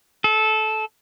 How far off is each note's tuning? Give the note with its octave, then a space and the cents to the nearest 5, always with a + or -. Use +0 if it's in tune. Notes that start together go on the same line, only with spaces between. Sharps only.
A4 -15